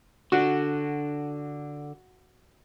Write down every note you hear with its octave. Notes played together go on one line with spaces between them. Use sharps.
D3 D4 F#4